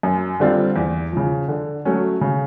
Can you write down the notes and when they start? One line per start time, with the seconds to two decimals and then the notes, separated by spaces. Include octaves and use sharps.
0.03 F#2
0.40 D3 G3 C4 F4
0.76 E2
1.12 C#3 F3
1.48 D3
1.85 F#3 A3 C#4
2.21 C#3